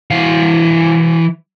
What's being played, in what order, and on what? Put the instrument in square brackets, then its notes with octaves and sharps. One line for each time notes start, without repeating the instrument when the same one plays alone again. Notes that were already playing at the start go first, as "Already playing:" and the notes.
[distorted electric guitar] E3 F5